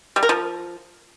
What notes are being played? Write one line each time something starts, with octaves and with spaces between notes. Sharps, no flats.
G3
A#4
F3